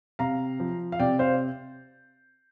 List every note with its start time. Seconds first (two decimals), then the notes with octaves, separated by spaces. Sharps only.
0.19 C3 F5 A#5
0.60 F3
0.92 F5
0.99 C3 D5 G5
1.19 C5 F5